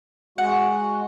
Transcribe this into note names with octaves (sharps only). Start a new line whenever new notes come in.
G#3 F#4 F#5